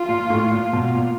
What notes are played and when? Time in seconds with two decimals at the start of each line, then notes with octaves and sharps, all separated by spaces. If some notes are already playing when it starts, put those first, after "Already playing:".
Already playing: F4
0.09 A#2
0.30 A2
0.51 A#2
0.73 B2
0.95 A#2